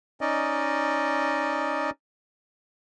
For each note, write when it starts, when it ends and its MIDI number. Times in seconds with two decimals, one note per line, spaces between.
0.21 1.90 61
0.21 1.90 63
0.21 1.90 74
0.21 1.90 75